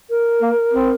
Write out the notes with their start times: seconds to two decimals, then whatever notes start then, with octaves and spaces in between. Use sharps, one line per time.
0.10 A#4
0.42 A#3
0.73 C4